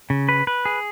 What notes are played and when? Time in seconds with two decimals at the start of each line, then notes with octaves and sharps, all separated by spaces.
0.10 C#3
0.29 B4
0.47 B4
0.65 G#4